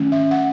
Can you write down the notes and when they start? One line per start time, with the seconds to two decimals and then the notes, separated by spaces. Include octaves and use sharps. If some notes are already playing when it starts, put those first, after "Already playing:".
Already playing: D#3 F#3 A3 C#4
0.12 E5
0.31 F#5